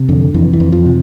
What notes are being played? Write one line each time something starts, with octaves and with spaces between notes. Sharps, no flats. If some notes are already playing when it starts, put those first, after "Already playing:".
Already playing: C3
F2 D3
F2 E3
E3
F2
F3
C3